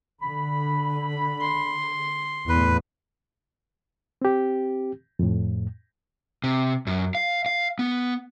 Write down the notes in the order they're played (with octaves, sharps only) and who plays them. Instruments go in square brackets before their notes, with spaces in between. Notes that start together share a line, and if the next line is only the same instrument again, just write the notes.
[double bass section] D3 [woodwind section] B5
[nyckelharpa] C6
[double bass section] E2 A2 [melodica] B4
[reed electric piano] C4 G4
F2 A2
[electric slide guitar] C3
F#2
F5
F5
B3